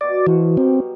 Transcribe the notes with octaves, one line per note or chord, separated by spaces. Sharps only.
B2 F#4 D5
B2 E3 F3 F#4
F#3 G3 B3 C4